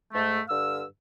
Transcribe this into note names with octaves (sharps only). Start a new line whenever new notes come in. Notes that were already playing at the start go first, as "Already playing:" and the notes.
G#2 A3
G2 D3 F5 E6